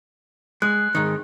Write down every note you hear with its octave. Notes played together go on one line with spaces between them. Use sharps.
G#3 F#6
G#2 D#3